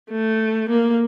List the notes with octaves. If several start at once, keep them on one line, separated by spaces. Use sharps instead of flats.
A3
A#3